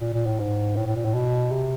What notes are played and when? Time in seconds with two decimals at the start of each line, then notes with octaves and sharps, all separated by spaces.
0.01 A#2
0.14 A#2
0.26 A2
0.39 G#2
0.76 A2
0.87 A2
0.95 A#2
1.05 A2
1.14 B2
1.52 C3